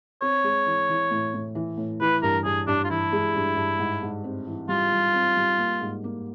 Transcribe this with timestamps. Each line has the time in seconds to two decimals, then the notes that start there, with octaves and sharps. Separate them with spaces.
0.22 C4 C#5
0.44 G#3
0.66 E3
0.89 E3
1.11 A2
1.34 A2
1.55 E3
1.77 A2
2.01 E3 B4
2.22 G2 A#4
2.45 G2 G#4
2.67 G2 D4
2.84 F4
2.90 E3 E4
3.12 G#3
3.35 G2
3.57 G2
3.79 G#2
4.03 G#2
4.24 C4
4.47 E3
4.69 G3 F4
4.92 G3
5.14 C4
5.37 G3
5.58 A#3
5.81 G#2
6.04 A#3